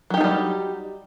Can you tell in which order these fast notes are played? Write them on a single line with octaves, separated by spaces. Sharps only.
F#3 G4 D#4 A3 G3